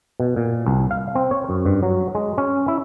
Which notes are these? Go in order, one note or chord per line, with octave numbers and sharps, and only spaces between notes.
B2
A#2
C2
F5
C4
C#5
F#2
G2
F#3
G#3
C#4
E4